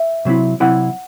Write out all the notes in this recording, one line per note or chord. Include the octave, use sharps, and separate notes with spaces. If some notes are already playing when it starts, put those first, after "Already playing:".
Already playing: E5
C3 F#3 C4 E4
C3 F#3 C4 E4 F#5